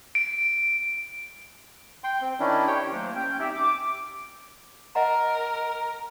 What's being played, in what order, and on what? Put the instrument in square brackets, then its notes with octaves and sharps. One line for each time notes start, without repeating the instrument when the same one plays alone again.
[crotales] D7
[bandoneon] G5 C6
C4
D#3 C#4 D4 E4
G4 C#5 G5
[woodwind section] F#3 A3 A#3 D4 C5
C#4 G5
C4 D#4 G4 D5 E5
D6
[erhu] A#4 [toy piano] D#5 F#5 A#5